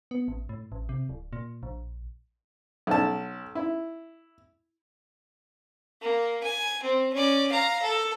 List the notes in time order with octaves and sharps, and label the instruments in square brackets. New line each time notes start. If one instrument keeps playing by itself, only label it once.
[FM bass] B3
A1
A2
A1
C3
D1
A#2
A#1
[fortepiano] B1 A5
E4
[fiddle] A#3
G#5
C4
C#4 D5
F5 A#5
A4